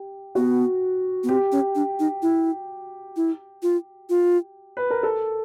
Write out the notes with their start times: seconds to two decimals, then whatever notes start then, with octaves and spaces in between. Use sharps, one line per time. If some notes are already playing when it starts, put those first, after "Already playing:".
Already playing: G4
0.35 B3 F#4
1.24 B3
1.29 C4 G4
1.52 C#4
1.75 D4
1.99 D#4
2.22 E4
3.16 E4
3.63 F4
4.09 F4
4.77 B4
4.90 A#4
5.03 A4